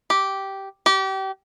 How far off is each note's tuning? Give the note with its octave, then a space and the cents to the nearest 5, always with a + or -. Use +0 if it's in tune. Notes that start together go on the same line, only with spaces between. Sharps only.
G4 -10
G4 -30